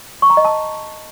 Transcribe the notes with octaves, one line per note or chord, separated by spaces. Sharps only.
C#6
A#5
D#5
A5